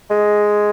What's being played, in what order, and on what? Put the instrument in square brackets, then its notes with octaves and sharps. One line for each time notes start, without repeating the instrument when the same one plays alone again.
[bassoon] G#3